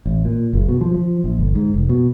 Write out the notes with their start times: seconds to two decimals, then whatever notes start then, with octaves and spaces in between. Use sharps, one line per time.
0.06 A1
0.25 A#2
0.53 F#1
0.68 B2
0.81 F3
0.94 F3
1.24 A#1
1.39 G1
1.55 G#2
1.74 F1
1.89 B2